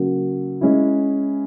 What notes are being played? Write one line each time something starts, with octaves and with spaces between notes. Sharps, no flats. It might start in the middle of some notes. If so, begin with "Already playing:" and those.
Already playing: C#3 F#3 A#3
G#3 C#4 E4